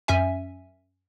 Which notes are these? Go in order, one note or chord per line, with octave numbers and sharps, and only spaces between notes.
F#2 C#4 E5 G#5